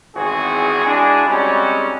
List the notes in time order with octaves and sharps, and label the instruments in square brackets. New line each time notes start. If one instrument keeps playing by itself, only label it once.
[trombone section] G#1 E2 E3 C4 F#4 G#4
G#3 D4 E4 F#4 G#4
G3 G#3 C4 C#4 D#4 F#4